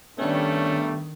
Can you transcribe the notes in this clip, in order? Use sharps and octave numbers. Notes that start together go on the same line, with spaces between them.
G2 D#3 G3 A3 B3 C#4 D4